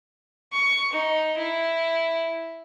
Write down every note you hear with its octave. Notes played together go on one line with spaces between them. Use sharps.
C#6
D#4
E4